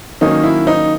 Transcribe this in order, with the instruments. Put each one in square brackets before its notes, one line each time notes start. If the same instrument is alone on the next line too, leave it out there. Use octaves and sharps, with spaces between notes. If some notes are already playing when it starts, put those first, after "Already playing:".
[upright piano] D#3 F#3 A#3 C#4 [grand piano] D#4
[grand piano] E4
D#4